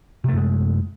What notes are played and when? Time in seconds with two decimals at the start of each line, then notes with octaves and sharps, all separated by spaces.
0.24 C3
0.29 A3
0.33 F#2
0.37 G#3